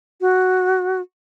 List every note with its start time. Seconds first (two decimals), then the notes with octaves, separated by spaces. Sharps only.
0.21 F#4